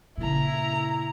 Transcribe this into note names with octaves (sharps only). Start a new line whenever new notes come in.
A#2 C#3 E4 A#5